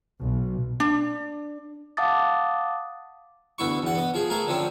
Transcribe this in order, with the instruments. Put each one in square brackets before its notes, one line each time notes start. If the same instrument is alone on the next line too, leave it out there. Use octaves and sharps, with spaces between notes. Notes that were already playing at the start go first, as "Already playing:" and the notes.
[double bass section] B1
[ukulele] D4
[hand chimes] F5 F#5 A5 D6 D#6 A6
[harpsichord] D2 B3 E4 C#6
E2 F#5
B3 D#5
F3 G#4
A3 G#4 A#4
D3 F3 C4 C#4